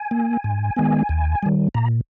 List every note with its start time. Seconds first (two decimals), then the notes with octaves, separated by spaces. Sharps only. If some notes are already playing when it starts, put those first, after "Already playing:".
Already playing: G#5
0.11 A#3
0.44 G#2
0.76 D#3 G#3 B3
1.09 D#2
1.43 D#3 G3
1.74 A#2 A#5